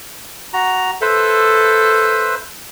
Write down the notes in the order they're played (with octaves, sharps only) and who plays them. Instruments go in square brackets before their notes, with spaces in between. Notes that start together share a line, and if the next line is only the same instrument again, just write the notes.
[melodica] F#4 A#5
[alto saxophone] A4 [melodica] B4 C5 E5